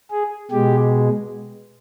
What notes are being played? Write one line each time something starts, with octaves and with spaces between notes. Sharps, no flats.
G#4
B2 G#3 G4